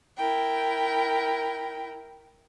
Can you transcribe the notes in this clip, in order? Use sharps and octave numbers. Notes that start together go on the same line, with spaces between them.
E4 A#4 G5